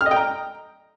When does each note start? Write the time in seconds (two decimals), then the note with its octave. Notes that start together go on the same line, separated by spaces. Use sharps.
0.01 F6
0.06 D#5
0.11 G5
0.16 A#5